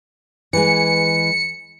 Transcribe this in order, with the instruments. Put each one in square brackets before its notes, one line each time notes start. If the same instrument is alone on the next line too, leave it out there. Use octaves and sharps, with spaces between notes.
[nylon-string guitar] E3 G#3 [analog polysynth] C#7